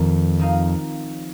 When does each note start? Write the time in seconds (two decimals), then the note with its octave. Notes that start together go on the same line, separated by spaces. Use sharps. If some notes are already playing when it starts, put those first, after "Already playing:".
Already playing: F2 D#3 G#3 D#4 A#4 C#5
0.39 F3 C4 D#4 A#4 F5